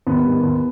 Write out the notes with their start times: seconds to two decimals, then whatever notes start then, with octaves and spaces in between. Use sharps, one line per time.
0.07 D#2 B3
0.25 D#3 G3
0.43 D#2